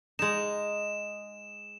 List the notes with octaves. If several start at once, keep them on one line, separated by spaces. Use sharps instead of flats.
G#3 D#4 E7